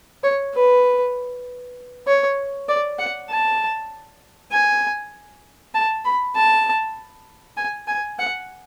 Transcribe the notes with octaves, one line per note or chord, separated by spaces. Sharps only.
C#5
B4
C#5
D5
F#5
A5
G#5
A5
B5
A5
G#5
G#5
F#5